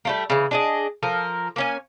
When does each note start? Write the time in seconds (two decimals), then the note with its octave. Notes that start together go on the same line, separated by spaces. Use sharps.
0.05 G3 A3 A#3
0.30 C#3 E3
0.51 D4 G#4 D#5
1.03 F3 A4 A#4
1.56 A#3 C#4 G#5